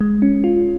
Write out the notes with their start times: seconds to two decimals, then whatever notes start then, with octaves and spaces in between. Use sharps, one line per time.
0.01 G#3
0.22 C#4
0.44 F4